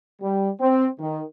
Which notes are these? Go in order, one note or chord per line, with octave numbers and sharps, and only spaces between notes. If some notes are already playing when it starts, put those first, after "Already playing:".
G3
C4
D#3